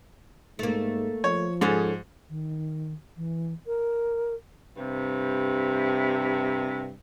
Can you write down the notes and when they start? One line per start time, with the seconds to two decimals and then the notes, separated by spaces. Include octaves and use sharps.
0.59 G#2 A3 A#3
1.24 F3 C#5
1.61 G#2 C#4 G#4 A4
2.29 D#3
3.17 E3
3.67 A#4
4.77 G2 C3